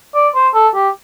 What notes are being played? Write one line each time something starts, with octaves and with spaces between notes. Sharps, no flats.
D5
C5
A4
G4